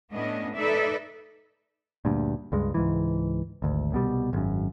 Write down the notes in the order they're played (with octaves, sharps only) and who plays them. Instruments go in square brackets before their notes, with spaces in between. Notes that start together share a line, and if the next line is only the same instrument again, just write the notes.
[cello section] A2 A3 B3 C#4 D4 D#5
D#4 A4 B4 D5 E5
[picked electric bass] D2 G2 A#2
C#2 G2 G#3
C#2 G#2 E3
G#1 D2
C2 B2 G3
G#1 F#2